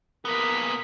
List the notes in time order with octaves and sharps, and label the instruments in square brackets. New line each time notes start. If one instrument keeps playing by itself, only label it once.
[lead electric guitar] A#2 B3 [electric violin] A#4 B6